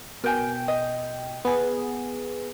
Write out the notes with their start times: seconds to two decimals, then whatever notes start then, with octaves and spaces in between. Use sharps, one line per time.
0.24 B2 A#4 G5 G#5
0.68 D#5
1.45 B3 G#4